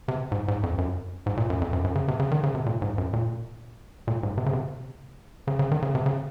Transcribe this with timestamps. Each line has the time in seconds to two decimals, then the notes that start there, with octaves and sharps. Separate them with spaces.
0.08 C3
0.32 G#2
0.48 G#2
0.63 F2
0.78 F#2
1.26 G#2
1.37 A#2
1.50 F#2
1.61 F2
1.73 F#2
1.84 F#2
1.95 C#3
2.08 C3
2.20 C#3
2.31 D#3
2.43 C#3
2.55 C3
2.66 A#2
2.82 G#2
2.98 F#2
3.13 A#2
4.07 A#2
4.23 G#2
4.38 C3
4.46 C#3
4.53 C3
5.47 C#3
5.59 C#3
5.72 D#3
5.82 C#3
5.95 C3
6.06 C#3